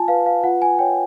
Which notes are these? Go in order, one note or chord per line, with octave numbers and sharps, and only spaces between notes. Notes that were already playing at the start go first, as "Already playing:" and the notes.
Already playing: F4 G#5 A5
B4 F5
F5
F4 F#5
G#5
C#5 G5